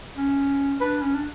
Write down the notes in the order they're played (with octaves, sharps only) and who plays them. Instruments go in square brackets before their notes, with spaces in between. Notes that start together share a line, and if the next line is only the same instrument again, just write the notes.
[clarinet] C#4
[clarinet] D4 [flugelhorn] B4
[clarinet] C#4
D4